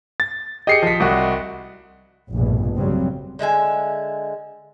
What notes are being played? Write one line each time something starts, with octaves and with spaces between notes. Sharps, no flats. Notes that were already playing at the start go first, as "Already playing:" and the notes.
A6
G4 G#4 D#5 C7 C#7
F3 B6
C2 F#4
F1 A#1 G2 B2
A#1 F2 C#3 F#3 G3 C4
D3 G#3 E5 G#5